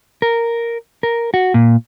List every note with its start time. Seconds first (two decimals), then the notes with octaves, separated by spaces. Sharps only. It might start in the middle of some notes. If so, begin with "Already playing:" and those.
0.22 A#4
1.03 A#4
1.34 F#4
1.54 A#2